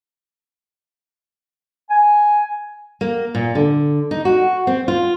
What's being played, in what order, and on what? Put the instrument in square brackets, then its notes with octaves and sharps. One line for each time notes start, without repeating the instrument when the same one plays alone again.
[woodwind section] G#5
[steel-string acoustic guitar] A#3
A#2
D3
D#4
F#4
C4
F4